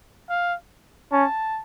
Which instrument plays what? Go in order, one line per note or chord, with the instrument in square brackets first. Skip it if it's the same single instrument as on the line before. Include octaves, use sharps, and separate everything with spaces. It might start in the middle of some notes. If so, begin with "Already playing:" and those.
[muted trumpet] F5
[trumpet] C#4 [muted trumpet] A5